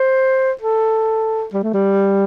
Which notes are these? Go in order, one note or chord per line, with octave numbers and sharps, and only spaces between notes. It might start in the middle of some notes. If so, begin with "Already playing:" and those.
Already playing: C5
A4
G3
A3
G3